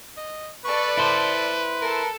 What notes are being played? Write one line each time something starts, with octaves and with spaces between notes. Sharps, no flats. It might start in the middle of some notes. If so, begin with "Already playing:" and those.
D#5
A4 B4 D5 C#6
E4 C5 A5
A4 A#4 A5